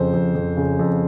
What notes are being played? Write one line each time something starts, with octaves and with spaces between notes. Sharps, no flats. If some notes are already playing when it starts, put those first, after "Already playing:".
Already playing: F2 C#3 C5
F2
F2
C#3
F2